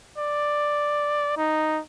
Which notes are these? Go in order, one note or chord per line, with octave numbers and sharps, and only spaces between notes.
D5
D#4